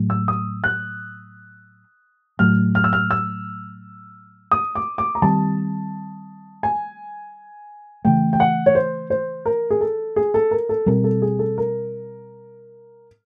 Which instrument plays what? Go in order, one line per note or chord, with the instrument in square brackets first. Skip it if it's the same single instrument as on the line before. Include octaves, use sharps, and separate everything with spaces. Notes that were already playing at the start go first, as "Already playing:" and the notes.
Already playing: [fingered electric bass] A2 F#3 A3
[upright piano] E6
D#6
F#6
[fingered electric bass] A2 F#3 A3 [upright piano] F6
[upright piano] F6
E6
F6
E6
D#6
D6
D6
A#5
[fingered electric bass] D#3 G3 C4 [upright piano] A5
[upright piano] G#5
[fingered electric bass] C#3 E3 A3 [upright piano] G5
[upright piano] G5
F#5
C#5
C5
C5
A#4
G#4
A4
G#4
A4
A#4
A4
[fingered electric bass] B2 G3 C4 [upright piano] A#4
[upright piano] A4
G#4
A4
A#4